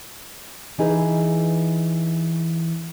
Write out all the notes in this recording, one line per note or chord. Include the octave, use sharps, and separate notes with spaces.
E3 D#4 G#4 B4